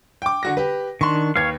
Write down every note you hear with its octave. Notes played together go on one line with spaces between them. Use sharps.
G5 D6
D3 F#4 A#6
G4 B4
D#3 D4 C6 C#6
D#2 B4 C#5 F5 G#6